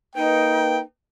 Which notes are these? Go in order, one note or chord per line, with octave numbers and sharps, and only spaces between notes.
A#3 D#4 B4 G5